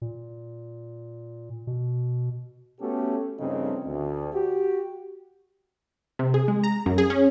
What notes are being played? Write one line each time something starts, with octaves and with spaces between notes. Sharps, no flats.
A#2
B2
A3 B3 C#4 F#4 G4 A4
A#1 G2 C#3 A3 C4 D#4
D2
F#4 G4
C3
G#4
G#3
A#5
F#2
G#4
C#4